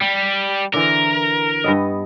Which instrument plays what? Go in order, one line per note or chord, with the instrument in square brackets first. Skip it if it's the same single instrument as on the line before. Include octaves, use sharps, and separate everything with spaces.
[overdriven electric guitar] G3
[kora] D3 E3 [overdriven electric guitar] A#4
[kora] G2 B3 D#5